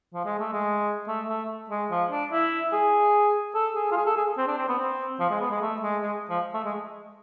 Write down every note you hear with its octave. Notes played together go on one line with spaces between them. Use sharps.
F3
G#3
A3
G#3
A3
A3
G#3
F3
D4
E4
G#4
A4
G#4
F4
G#4
A4
G#4
C4
D4
C4
B3
C4
F3
G#3
B3
G#3
A3
G#3
G#3
F3
A3
G#3